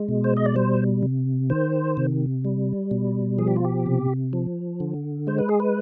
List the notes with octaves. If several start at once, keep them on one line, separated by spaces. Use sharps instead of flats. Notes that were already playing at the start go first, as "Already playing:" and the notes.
Already playing: G#3
B2
C5
D#5
D5
G3 C5
C3
D#3 C5
C3
G3
B2
F3 G#4
G4
F4
G4
C3
F3
D3
G#3 C5
B4
G#4
B4